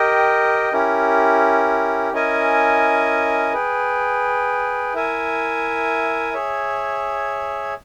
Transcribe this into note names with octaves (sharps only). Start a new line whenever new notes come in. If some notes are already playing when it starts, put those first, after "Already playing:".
Already playing: G4 A#4 D#5 G5
C#4 E4 G4 A#4
C#4 E4 A#4 D#5 G#5
G#4 B4 G5
E4 A#4 E5 G#5
G#4 C#5 E5